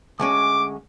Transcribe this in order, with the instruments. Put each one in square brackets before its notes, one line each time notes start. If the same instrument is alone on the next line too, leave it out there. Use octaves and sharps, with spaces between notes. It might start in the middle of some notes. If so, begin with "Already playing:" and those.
[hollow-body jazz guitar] D2 G#3 C#4 [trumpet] D6